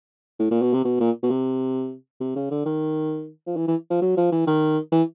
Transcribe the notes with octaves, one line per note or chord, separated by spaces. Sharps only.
A2
A#2
B2
C3
B2
A#2
B2
C3
C3
C#3
D3
D#3
F3
E3
E3
F3
F#3
F3
E3
D#3
E3